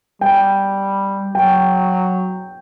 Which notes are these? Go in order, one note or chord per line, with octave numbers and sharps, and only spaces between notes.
G3 G5
F#3 G5